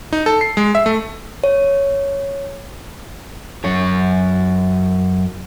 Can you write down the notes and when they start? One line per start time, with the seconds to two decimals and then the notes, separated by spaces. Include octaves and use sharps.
0.13 D#4
0.26 A4
0.41 C7
0.57 G#3
0.75 E5
0.86 A3
1.44 C#5
3.64 F#2 C#5